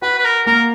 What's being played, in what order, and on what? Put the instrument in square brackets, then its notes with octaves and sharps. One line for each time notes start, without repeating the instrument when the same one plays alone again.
[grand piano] F#4 [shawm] B4
[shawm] B4
A#4
[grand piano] A#3 [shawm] A#4